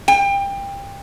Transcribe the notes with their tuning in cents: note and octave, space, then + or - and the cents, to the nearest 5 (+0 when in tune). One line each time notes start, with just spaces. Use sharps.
G5 +25